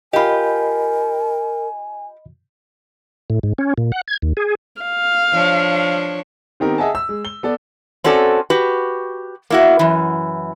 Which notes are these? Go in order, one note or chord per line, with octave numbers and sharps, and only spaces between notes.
F4 G4 A#4 D#5 G#5 B5
A2
G#2
C#4
A#2
F#5
G#6
D#2
G#4
F5
F3 D4 C#5
D#3 B3 C4 D#4 G4 A#4
G#4 D#5 E5 F#5 G#5 A5
E6
G#3
G7
B3 A4 D5
C4 C#4 F#4 A4 D5
F#4 G4 B4
A#3 E4 F#4
F#2 E3